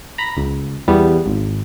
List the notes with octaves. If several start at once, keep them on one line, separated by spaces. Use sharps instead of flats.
A#5 B5
C#2
E2 G3 B3
G#1